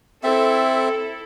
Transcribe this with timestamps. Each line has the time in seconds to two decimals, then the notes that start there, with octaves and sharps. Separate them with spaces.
0.24 C4 E4 A4 E5